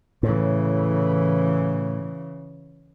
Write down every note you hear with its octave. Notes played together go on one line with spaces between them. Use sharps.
A2 C#3 E3